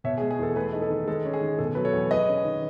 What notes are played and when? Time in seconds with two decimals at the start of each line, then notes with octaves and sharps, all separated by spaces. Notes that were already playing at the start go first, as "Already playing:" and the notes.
0.04 B2 C#5 E5
0.18 G#4
0.21 G#3
0.31 G#4
0.39 E2 A4
0.56 A3 G#4 B4
0.73 D#4
0.82 A4
0.90 D#3
1.08 G#3 A4
1.25 C#4
1.33 G#4
1.42 D#3
1.59 B2 A4
1.75 F#3 B4
1.85 A4 C#5
1.93 E2
2.11 G#3 B4 D#5
2.28 C#4
2.44 D#3